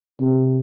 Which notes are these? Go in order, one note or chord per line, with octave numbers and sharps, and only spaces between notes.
C3